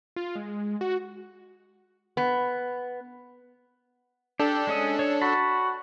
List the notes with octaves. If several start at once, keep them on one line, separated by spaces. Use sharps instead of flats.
F4
G#3
F#4
B3
D4 G4 A4
G#3 C#4 D#6
C#5
F#4 A5 B5